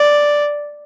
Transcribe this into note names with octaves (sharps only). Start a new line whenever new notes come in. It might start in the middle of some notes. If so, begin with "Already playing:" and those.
Already playing: D5